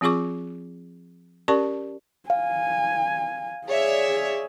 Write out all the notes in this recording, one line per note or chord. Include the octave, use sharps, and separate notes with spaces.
F3 C4 F4 G#4 C#6 D6
C#4 G4 A#4 D5 A5 C#6
F5 G#5
G#4 C#5 D5 E5